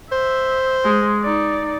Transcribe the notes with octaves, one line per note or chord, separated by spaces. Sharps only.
C5 E5
G#3
D#4 D5